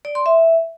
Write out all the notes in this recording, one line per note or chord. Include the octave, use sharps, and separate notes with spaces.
D5
C6
E5